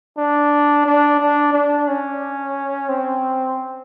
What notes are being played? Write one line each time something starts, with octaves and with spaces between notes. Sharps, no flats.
D4
D4
D4
D4
C#4
C4